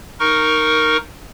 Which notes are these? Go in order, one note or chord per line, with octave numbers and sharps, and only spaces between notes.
D#4 A#4 C#6